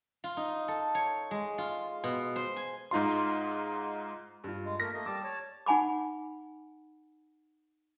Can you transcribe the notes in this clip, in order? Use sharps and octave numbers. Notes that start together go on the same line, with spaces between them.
F4
D#4
A4
C#5
G#3
F4
B2
C5
G#5
G#2 D#4 F4 C6
G2 F4
G#3
A3 A#3 A#4 A#6
A3 A#3 D#5
G3 A5 D6
C#5 A5
D#4 F#5 G#5 B5 D6